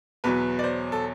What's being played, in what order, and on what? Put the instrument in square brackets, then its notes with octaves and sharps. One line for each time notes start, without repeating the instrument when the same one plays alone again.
[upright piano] E2 B2 F#3 B4
D5
C5
A4